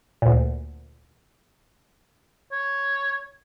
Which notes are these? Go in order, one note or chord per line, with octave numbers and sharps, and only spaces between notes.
D2 A#2
C#5